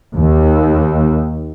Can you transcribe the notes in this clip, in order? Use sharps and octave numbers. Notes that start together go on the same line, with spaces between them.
D#2